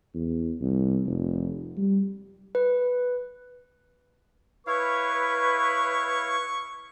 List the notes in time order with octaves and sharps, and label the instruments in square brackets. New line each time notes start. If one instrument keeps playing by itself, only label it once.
[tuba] E2
C2
F1
G3
[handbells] B4
[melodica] E4 C#5 F5 [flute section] B4 [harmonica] C#6